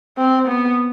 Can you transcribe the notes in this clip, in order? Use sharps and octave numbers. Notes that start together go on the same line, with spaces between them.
C4
B3